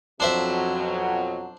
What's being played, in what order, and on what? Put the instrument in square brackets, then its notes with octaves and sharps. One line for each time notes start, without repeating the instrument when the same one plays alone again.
[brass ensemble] F2 B2 F#3 [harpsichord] D4 C5 E5